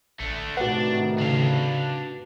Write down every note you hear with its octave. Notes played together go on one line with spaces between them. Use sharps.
A1 A3 D4
A2 C3 D#3 D4 F#4 B4 F#5
C#3 D4 F5